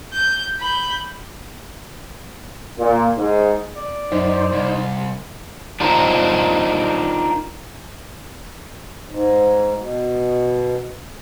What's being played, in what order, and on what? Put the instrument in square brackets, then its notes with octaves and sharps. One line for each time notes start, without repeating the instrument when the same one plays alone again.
[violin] G6
B5 G6
[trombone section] A#2
G#2
[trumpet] D5
[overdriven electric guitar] F#2 [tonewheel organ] D#4 C5
[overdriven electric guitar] C2
[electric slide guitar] D4 D#4 F4 A#4 C5 D#5
[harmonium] G#2
B2